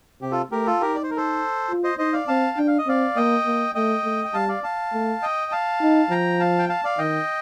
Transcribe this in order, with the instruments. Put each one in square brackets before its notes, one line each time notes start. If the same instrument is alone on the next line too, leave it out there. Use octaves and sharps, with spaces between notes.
[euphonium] C3 [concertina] G4
[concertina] F4 A4
[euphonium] A3 [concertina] G4 A#4
[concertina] F4 A4
[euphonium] D#4 [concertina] G4 A#4
[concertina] D5
C5
A#4
A4 C5
[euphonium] F4
[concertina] C5 D#5
[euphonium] D#4 [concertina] C5 D#5
[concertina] D5 F5
[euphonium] C4 [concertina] F5 A5
[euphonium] D4 [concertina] G5
[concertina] F5
D#5
[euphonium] C4 [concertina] D5 F5
[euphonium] A#3 [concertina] D#5 G5
[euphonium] A#3
[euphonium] A3 [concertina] D#5 G5
[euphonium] A3
[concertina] G5
[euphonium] G3 [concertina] F5 A5
[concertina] D5 F5
F5 A5
[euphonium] A3
[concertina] D#5 G5
F5 A5
[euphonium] D#4
[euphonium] F3 [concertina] G5 A#5
[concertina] F5 A5
G5
F5 A5
D5 F5
[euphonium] D#3 [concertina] D#5 G5